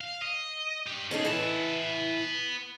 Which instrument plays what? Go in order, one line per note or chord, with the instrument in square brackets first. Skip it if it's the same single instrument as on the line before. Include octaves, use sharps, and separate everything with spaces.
[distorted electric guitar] F5
D#5
D4 G4
[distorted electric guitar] D#3 G#4 [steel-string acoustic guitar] C#4 D#4 A4
[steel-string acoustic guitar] E3 E4 [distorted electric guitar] B3 A5